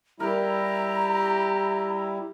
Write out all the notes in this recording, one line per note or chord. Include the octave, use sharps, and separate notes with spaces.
G3 E4 G4 A#4 A#5